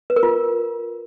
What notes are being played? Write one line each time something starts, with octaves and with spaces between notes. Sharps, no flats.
B4
A#4
F4